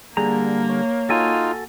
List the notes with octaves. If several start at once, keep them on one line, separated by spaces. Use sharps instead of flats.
D3 G3 A#3 G#4 A#5
C#5
D#4 F4 F#4 A4 G#5